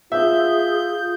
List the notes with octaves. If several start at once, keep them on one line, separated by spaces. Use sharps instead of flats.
F4 G#4 E5 G6